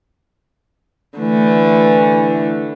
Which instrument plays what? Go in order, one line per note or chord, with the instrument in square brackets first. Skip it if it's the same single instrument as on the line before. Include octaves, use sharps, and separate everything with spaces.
[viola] D3 A3 [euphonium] E3